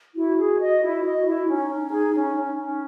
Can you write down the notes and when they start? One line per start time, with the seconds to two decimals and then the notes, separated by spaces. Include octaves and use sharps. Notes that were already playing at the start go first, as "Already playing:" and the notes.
0.16 E4 F#4
0.38 G#4
0.60 D#5
0.82 E4 F#4
1.04 D#5
1.25 E4
1.48 C#4 D#4
1.70 C#4
1.92 G#4
2.14 C#4
2.36 C#4
2.58 C#4